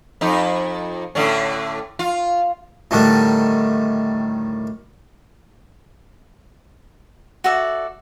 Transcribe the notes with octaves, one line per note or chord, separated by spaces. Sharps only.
F2 D#4
A2 D3 C#4
F4
A2 D3 D#3 G3 A3
F#4 A4 D5 E5